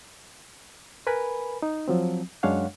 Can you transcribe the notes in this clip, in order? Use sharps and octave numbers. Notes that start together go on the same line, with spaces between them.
A#4 B4 G#5 B5
D#4
F3 F#3 C4
F#2 G#3 D4 C#5 F5 F#5